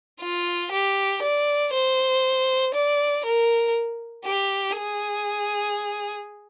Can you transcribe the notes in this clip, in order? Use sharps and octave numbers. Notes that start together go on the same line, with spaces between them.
F4
G4
D5
C5
D5
A#4
G4
G#4